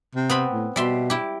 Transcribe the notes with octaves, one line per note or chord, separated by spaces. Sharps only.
C3
B3 C4 B5
A2
B2 G3 E5 C6
E4 G4